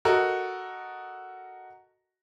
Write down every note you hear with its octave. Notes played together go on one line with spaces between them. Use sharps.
F#4 A4 A#4 D#5